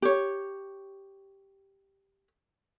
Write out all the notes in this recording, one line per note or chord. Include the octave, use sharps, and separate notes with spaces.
G4 C#5